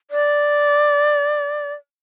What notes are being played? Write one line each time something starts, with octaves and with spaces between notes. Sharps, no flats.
D5